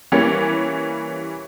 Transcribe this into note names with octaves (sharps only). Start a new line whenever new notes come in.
E3 G3 A#3 C#4